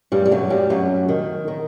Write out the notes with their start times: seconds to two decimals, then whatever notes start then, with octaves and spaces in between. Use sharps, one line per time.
0.12 G2 G3
0.26 G3
0.31 F#2 F#3
0.50 G2 G3
0.70 F#2 F#3
1.09 D#3
1.48 D#3